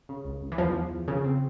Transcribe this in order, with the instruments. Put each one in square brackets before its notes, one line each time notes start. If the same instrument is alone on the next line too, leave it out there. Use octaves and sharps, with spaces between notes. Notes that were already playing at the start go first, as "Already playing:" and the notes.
[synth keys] C#3
C#2
C#2
[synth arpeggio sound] E3
[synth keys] E2 [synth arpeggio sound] F3
[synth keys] E2
E2
[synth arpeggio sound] C#3 [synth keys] F3
[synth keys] C4